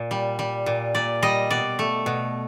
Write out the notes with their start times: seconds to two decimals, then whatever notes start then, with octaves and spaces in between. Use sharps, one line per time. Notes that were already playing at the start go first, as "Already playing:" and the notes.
Already playing: A#2
0.11 G3
0.39 G3
0.66 A#2
0.95 A#2 D5
1.22 G3 D#5
1.51 B2 D5
1.79 A3
2.06 B2